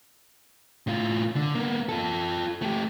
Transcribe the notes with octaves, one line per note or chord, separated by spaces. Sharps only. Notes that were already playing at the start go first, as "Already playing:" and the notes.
A2 F4
D3
A#3 B3
F4 A4
A3 G4